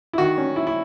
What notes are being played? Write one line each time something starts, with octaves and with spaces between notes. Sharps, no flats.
E4
D#3 F#4
C#4
E4
E4